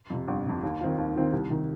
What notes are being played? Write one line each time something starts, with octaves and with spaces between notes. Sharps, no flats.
F2 C3
G1
F2 C3
D#2
D#3 C4 F4
D#2
D#3 C4 F4
C2
C3 D#3